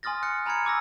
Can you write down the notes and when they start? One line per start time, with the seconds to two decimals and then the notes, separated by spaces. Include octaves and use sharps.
0.03 G#5 C6 D#6 F6 A6 A#6
0.23 F6 F#6 C#7
0.46 G#5 A#5 B5 F6 G#6 C#7
0.65 G#5 D6 E6 A#6